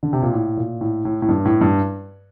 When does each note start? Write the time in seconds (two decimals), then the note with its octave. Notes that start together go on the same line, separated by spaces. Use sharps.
0.03 D3
0.13 C3
0.22 A#2
0.33 A2
0.57 A#2
0.81 A2
1.05 A2
1.22 A2
1.29 G2
1.45 A2
1.61 G2